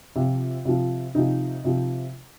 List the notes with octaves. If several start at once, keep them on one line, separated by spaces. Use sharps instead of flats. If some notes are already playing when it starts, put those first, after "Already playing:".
C3 F3 F4
C3 F3
C3 F3 D#4
C3 F3